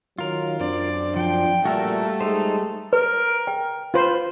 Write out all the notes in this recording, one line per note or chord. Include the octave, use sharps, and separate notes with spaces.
D#3 F#3 F4 A#4
F#2 C4 D4 C5 D5
F3 G5
A#2 G3 A3 F#4 A#4 E5
G#3 D#4 C5
A#4 B4
G5
F4 B4 C5